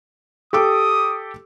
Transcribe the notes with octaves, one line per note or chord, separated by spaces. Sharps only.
G4 A4 D6 D#6